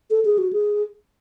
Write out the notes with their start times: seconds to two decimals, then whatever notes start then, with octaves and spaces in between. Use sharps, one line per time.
0.10 A4
0.25 G#4
0.38 F#4
0.53 G#4